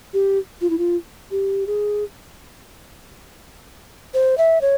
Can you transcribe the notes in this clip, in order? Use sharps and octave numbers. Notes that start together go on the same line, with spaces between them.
G4
F4
E4
F4
G4
G#4
C5
E5
C#5